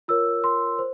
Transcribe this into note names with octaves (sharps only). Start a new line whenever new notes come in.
F4 A#4 C#5 E6
C6
C5